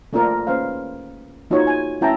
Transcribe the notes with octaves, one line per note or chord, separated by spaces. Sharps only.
A3 A#3 D4 F4 A#4 D5
A#3 C#4 B4 C5 F5
A#3 D#4 F4 F#4 C#5
G#5
A3 C#4 E4 G5 A5 A#5